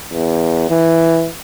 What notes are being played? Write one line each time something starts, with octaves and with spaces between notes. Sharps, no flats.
E2
E3